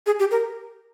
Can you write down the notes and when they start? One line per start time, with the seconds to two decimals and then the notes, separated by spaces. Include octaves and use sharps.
0.06 G#4
0.19 G4
0.31 A#4